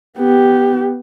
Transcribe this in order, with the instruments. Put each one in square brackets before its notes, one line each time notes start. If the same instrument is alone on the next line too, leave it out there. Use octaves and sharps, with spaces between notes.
[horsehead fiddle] B3 G4